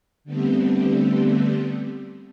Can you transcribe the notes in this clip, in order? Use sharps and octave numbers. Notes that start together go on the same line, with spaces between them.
D3 G3 A3 B3 C4